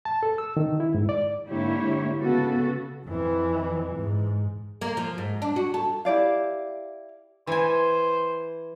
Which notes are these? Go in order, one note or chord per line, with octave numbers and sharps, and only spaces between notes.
A5
A4
E6
D#3
E4
G#2
D5
G#2 D3 A#3 E4 G4 C#5
C#3 B3 F#4 A4
F2 E3
G#2
A#3
F3
G#2
D4
F#4
A4
E4 G4 D5 F5
E3 C5 G#5